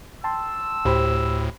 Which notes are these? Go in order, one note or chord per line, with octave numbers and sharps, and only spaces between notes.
G5 A5 C6 E6
D2 A2 G4 C5 B5